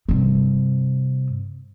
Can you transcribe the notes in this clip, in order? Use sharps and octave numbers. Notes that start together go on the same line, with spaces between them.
G2 C3